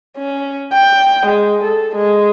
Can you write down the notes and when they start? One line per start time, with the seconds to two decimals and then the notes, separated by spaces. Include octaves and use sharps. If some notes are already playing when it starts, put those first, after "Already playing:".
0.18 C#4
0.73 G5
1.26 G#3
1.64 A4
1.96 G#3